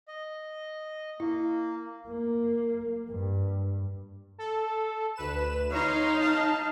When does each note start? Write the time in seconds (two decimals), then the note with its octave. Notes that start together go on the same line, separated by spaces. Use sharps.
0.08 D#5
1.20 A#3 E4
2.09 A#3
3.09 G2
4.38 A4
5.15 D2 B4 E7
5.71 D#4 C#5 F5 A#5 C6
6.17 D#5 A5